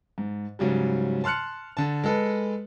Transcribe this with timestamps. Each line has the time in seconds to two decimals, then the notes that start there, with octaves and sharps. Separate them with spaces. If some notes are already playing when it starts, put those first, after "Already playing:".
0.18 G#2
0.59 G#2 C#3 F#3 G3
1.24 A5 C6 F6 F#6 C#7
1.77 D3 A5
2.04 G#3 A4 B4